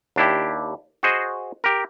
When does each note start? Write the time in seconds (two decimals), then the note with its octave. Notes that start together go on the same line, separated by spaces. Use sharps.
0.16 D#2 D4 E4 G4
1.03 F#4 G#4 C5 D#5
1.64 G4 A#4